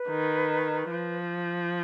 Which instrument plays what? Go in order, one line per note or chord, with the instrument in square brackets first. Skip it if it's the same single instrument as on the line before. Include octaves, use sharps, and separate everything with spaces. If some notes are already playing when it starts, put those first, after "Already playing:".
Already playing: [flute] B4
[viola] D#3
F3